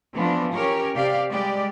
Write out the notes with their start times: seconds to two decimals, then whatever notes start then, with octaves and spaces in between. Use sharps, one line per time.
0.15 E3 F3 A3 B3 D4
0.54 C#4 G4 A#4 C#5
0.95 C3 G4 D5 F5
1.31 G3 G#3 G4 D5